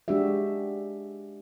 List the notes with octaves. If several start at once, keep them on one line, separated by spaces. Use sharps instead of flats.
G#3 D4 F#4 G4 E5